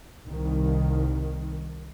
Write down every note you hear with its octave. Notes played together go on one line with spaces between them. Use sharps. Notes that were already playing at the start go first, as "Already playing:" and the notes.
C2 D#3